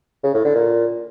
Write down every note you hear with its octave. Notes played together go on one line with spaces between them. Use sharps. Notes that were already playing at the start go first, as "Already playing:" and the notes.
C#3
A2
D3
A#2